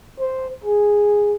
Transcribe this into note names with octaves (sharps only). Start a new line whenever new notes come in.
C5
G#4